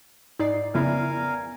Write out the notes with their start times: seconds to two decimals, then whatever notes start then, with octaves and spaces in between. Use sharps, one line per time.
0.39 G#2 D#4 D5 C7
0.74 F2 C#3 B3 E4 A#4 D5 F5 G#5